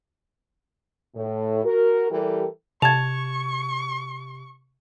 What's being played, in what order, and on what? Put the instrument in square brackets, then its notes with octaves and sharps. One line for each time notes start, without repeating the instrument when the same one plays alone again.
[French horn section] A2
F#4 A#4
E3 G3 G4 A4 A#4
[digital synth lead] C3 [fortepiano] A5 [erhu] C#6 [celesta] G#6 F7